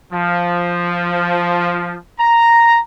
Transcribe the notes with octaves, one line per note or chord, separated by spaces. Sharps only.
F3
A#5